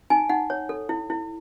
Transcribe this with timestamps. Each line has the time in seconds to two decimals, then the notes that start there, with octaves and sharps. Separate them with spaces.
0.10 D#4 G#5
0.29 D#4 F#5
0.50 C#5
0.69 A4
0.89 E4
1.10 E4